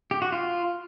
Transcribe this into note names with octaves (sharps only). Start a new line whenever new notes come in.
G4
F#4
F4